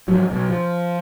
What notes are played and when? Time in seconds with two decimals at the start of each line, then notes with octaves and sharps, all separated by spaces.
0.08 G#2 F3 F#3
0.30 B1 B2
0.49 F3